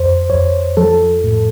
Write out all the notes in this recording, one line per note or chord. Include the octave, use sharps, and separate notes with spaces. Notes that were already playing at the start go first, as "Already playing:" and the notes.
Already playing: F2 C5
F2 C#5
F3 A4
A2